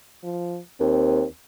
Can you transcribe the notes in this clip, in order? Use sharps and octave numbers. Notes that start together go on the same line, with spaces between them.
F3
D#2 C4